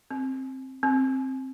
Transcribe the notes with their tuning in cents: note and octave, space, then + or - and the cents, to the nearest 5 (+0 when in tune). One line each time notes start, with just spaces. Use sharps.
C4 +10
C4 +10